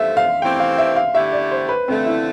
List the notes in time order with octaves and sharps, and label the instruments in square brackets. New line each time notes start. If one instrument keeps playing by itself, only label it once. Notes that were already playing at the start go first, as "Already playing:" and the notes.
Already playing: [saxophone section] G2 F3 A3 [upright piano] E5
[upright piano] F5
[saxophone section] E3 A3 C4 G4 [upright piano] G5
[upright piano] F5
E5
F5
[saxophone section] D3 A3 E4 G4 [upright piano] E5
[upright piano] D5
C5
B4
[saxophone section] D3 F3 A3 [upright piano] C4
[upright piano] E4